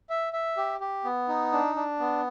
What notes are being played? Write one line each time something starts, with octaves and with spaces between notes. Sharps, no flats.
E5
E5
G4
G4
B3
D#4
D4
D4
B3